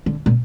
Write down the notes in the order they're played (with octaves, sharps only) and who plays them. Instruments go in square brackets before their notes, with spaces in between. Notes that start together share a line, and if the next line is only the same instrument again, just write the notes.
[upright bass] D3
A#2